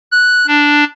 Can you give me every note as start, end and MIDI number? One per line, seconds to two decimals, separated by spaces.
0.12 0.47 90
0.47 0.84 62